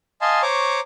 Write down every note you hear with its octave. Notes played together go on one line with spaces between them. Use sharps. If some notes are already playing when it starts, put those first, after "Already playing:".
D#5 F5 G#5 A5 C6
C5 C#5 A#5 C#6 D6